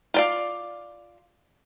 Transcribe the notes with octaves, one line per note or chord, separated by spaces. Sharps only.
F4 D5 F5